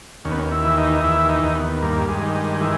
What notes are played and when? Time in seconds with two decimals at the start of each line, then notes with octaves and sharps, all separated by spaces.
0.25 D#2 C#4
0.31 B3
0.39 C#4
0.52 E4
0.65 E3
0.78 D#4
1.03 D#2 E4
1.29 D#4
1.43 D#2
1.55 B3
1.82 G2 A#3
2.09 G#3
2.22 D#3
2.34 G#3
2.61 E3 G#3